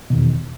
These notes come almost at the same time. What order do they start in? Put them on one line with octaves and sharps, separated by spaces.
B2 D#3 E2